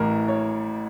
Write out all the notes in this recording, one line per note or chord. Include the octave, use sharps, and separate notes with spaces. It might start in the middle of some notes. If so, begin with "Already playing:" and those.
Already playing: A1 A2 E3 A#4
C#5